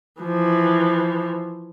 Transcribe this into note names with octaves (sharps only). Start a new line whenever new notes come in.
E3 F3